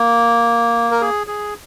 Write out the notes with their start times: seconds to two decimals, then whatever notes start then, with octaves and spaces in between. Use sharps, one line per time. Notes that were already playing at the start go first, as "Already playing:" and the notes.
Already playing: A#3
0.91 A#4
1.01 G#4
1.27 G#4